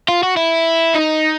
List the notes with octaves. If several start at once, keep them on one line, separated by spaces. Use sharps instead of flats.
F4
F#4
E4
D#4